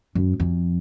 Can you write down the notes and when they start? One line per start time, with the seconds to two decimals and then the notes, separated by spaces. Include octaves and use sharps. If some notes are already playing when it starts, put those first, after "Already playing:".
0.15 F#2
0.40 F2